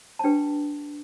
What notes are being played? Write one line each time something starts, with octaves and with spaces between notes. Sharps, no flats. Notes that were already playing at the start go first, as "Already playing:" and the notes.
A5
D4 G4 B4 G5